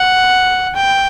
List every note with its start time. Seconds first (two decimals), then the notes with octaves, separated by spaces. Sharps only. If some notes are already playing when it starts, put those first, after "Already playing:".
Already playing: F#5
0.76 G5